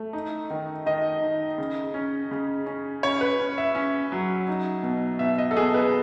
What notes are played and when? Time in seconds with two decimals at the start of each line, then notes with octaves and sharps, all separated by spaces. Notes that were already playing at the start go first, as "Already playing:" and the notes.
Already playing: A3
0.13 D#4
0.50 D#3
0.86 D#3 D#5
1.22 D#4
1.58 C#3
1.94 C#4
2.31 C#3
2.66 C#4
3.03 C#4 C#5
3.21 B4
3.39 C#4
3.58 E5
3.75 C#4
4.12 F#3
4.48 D#4
4.83 B2
5.19 B2 E5
5.38 D#5
5.51 A4
5.57 B2 G#4
5.74 B4